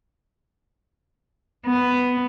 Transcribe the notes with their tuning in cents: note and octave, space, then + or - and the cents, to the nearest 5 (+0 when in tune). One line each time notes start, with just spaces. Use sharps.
B3 +5